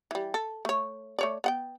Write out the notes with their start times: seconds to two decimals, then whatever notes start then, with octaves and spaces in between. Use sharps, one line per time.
0.11 E3 G3
0.34 A4
0.65 A3 C#5
1.19 A3 C#5 D5
1.44 B3 F#5 G5